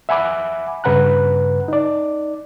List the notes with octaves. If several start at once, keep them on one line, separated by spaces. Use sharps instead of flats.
E5 F#5 G#5 B5 D6
G2 C#3 B4 F#5 A#5 F#6
D#4 D5